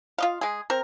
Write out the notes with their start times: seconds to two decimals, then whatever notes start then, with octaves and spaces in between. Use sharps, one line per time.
0.18 F4 D#5 F5
0.41 G#3 G#4
0.70 C4 A#4